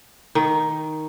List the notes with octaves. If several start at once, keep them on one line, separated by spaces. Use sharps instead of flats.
D#3